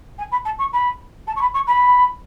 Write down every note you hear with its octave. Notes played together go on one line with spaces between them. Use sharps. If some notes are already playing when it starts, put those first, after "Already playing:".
G#5
B5
A5
C#6
B5
A5
C#6
B5
C#6
B5